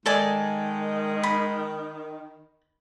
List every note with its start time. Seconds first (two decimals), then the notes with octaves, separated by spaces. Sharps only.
0.06 D#3 G#3 A4 D5 G#5
1.23 B5